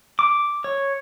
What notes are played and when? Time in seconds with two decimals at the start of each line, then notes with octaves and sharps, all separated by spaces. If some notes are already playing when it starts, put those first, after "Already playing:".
0.19 D6
0.64 C#5